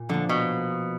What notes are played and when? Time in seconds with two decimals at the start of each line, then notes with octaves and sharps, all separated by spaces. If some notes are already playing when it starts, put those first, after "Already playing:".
Already playing: A#2
0.09 D3 F3 A#3
0.29 B2